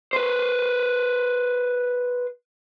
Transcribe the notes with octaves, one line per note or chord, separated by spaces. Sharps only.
B4 C5